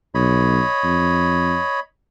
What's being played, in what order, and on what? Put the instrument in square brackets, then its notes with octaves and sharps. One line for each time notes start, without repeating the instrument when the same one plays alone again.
[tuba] B1 [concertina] C#5 D#5 B5
[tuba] F2